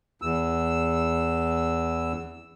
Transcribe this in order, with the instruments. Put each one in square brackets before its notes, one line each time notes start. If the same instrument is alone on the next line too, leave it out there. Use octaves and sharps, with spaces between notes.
[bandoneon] E2 E6